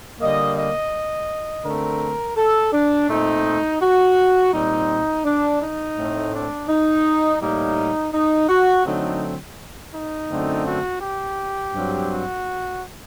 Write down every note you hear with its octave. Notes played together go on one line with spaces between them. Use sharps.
D3 G3 A#3 D#5
D#5
D3 A3 C4 A#4
A4
D4
A#2 A3 C4 D#4
F#4
A#2 G3 C4 D#4
D4
D#4
A2 A3 C4
D4
D#4
A2 G3 A#3 D#4
D#4
F#4
D3 F#3 A3 C4 D#4
D#4
F#2 D3 A3 C4
F#4
G4
G2 F#3 C4
F#4